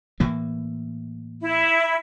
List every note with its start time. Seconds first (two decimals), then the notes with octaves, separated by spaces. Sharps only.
0.20 A2 E3 A#3
1.41 E4